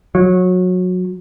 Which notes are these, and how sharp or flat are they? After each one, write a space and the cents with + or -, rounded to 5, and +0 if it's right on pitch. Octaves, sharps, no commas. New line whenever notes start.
F#3 -20